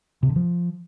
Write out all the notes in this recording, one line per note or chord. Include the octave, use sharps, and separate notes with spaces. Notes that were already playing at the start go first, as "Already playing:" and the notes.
C3
D3
F3